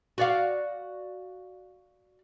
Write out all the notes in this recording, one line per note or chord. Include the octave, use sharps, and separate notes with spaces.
F#4 D5 F5